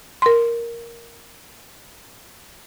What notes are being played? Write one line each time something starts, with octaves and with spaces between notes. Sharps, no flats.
A#4 C6